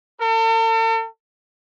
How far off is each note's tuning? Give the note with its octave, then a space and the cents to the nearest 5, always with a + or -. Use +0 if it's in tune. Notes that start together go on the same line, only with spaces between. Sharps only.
A4 +45